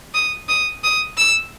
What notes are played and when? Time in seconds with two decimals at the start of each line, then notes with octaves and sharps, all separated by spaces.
0.14 D#6
0.49 D#6
0.84 D#6
1.18 E6